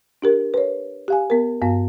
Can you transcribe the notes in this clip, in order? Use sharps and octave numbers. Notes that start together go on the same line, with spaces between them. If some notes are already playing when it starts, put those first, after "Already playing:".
D4 G4 A#4
B4 C#5
G4 F5 G#5
B3 A#4
G2 B3 F5